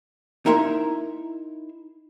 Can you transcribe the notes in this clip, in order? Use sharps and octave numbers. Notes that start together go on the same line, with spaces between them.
D#4 E4 A#4 E5 C6